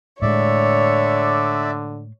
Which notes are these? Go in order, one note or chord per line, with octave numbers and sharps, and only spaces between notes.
A2 D3 G#3 C#5 D5 E5